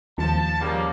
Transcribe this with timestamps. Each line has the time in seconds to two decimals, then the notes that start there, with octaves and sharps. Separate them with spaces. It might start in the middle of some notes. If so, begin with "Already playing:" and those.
0.18 D#2 F3 A5
0.59 C#3 F3 G3 A#3